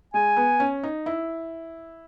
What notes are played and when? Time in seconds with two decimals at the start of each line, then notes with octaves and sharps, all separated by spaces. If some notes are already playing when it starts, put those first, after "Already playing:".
0.14 G#3 G#5
0.37 B3
0.60 C#4
0.83 D#4
1.06 E4